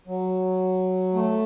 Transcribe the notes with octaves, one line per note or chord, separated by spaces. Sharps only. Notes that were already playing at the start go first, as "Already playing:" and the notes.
F#3
A3